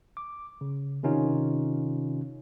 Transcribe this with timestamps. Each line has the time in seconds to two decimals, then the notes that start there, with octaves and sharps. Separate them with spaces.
0.17 D6
0.61 C#3
1.03 C3 D#3 C#4 D#4 F4